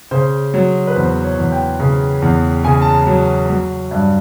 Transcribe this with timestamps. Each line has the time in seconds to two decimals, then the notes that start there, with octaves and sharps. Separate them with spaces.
0.11 C#3 C5
0.54 F#3
0.87 B4
0.96 E2 C5
1.24 C#5
1.38 E2
1.52 G5
1.80 C#3
2.22 E2
2.64 C#3 G#5
2.82 A5
2.93 A#5
3.07 F#3
3.49 F#3
3.91 G2